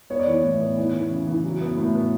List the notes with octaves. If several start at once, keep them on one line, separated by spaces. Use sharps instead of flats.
B3 C#5
D5
E3 C#5
A2
B3
E3
E3
C#3
E3
F#3
B3
A2
B3